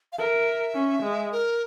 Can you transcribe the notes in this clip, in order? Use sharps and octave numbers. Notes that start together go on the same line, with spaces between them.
F5
A#4 E5
C#4
G#3
A#4